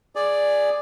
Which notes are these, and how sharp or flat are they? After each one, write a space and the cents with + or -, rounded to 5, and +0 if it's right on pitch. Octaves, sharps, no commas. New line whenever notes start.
G#4 +0 D5 +5 G#5 +0